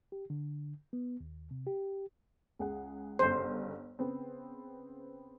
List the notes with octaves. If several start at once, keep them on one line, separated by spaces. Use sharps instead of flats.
G4
D3
B3
D#2
C3
G4
C#2 G#4 F#5
G1 C#3 C5
C#3 B3 C4